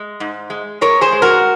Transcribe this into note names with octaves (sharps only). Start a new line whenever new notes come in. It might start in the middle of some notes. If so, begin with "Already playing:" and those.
Already playing: G#3
G#2
G#3
G#3 A#4 C#5
G#4 C5
G#3
F#4 A#4